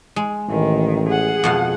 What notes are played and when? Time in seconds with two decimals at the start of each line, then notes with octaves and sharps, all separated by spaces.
0.16 G#3
0.49 A1 D#3
1.09 G#4 F#5
1.44 F2 B2 F5